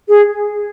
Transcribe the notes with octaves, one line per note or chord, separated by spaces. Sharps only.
G#4